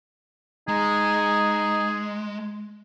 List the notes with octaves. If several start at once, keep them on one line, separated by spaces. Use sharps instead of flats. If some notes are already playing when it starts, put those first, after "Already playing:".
G#3 D#4 G#4